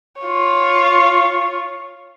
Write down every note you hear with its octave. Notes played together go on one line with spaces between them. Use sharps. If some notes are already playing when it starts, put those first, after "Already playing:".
F4 C#5